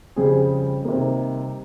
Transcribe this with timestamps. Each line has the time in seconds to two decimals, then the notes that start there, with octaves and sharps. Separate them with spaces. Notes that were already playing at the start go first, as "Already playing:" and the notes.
0.16 F2 C#3 G3 C4 G#4
0.85 C3 D#3 G3 A#3